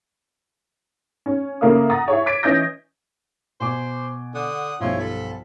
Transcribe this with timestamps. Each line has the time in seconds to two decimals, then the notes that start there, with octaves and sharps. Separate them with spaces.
1.26 C#4
1.61 C#3 A#3 E4 A4 F5 D#6
1.90 F#5 A#5 D#6 A6
2.08 E4 G#4 C#5
2.26 D6 G#6 A6 B6 D7
2.43 E3 C#4 D#5 D#6 G6 A#6
3.60 B2 C5 G#5 D6
4.35 D3 F#5 D#6
4.81 B1 G2 F3 E4 C#5
4.99 F3 A4 B5